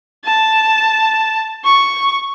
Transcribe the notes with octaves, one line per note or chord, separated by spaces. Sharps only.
A5
C#6